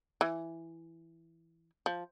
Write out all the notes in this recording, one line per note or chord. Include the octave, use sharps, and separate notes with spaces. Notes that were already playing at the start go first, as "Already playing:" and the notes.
E3
F3